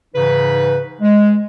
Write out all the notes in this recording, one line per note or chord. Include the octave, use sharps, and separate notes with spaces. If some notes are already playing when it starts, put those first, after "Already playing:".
G#2 C#3 E3 D#4 B4
G#3